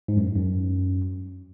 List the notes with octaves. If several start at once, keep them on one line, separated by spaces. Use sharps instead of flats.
G#2
F#2
F#2